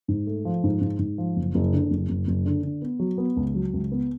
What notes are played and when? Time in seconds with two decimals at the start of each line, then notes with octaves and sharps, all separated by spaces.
0.08 G#2
0.27 A3
0.45 F3
0.64 G#2
0.81 G#2
0.99 G#2
1.18 F3
1.36 F#1
1.55 F#1
1.73 D3
1.91 F#1
2.09 F#1
2.27 F#1
2.46 D3
2.63 D3
2.82 B3
3.00 F#3
3.18 B3
3.37 C#2
3.55 F#3
3.74 C#2
3.92 B3